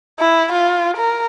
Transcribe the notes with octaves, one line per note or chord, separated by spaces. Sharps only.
E4
F4
A#4